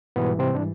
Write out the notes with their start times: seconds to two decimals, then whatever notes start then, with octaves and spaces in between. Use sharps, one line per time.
0.16 G#2 B2 E3 G3 B3
0.39 C3 C4
0.55 D4